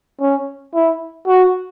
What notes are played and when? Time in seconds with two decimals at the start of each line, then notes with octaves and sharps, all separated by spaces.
0.20 C#4
0.74 E4
1.27 F#4